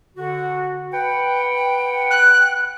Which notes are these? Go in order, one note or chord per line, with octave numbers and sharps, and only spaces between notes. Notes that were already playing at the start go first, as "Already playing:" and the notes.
D3 F#4
B4 F#5 G5
F#6